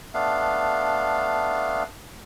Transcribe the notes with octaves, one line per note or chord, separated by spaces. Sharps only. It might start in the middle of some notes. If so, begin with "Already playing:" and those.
A3 B3 D4 F5